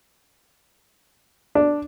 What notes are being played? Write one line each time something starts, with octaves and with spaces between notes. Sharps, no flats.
D4